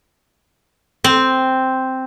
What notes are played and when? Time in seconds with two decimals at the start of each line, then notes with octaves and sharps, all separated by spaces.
1.04 C4